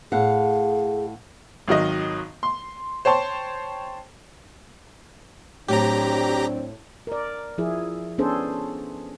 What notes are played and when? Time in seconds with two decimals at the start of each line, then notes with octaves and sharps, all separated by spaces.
0.12 A2 G#4 F5 F#5
1.68 G#1 D#3 F#3 D#5
2.43 C6
3.05 C5 C#5 G5 A5 C6
5.68 A2 F#3 C4 D4 G4 A#5
7.07 A#4 D5
7.58 F3 E4 G#4
8.18 B3 C#4 D4 G#4 A4 C5